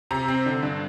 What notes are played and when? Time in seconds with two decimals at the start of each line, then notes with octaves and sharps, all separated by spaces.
0.11 C3 A#5
0.28 C4
0.46 D3
0.63 G2